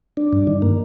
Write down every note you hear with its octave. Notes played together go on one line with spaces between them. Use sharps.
D4
G2
D#3
A#3